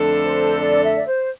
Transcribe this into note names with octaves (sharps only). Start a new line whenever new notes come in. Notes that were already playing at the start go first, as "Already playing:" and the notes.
Already playing: F2 D3 A3 D4 A4
C5
D5
E5
D5
C5